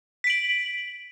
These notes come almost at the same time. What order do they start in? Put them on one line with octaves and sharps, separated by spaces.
B6 D7 F#7